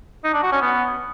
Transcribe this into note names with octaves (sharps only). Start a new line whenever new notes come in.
D#4
D4
F#4
C#4
B3